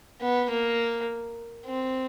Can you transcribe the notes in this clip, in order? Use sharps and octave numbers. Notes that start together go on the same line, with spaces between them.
B3
A#3
C4